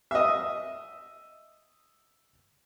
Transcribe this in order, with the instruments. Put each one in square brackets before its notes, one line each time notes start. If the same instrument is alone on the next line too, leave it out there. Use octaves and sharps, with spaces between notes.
[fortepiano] D#5 E5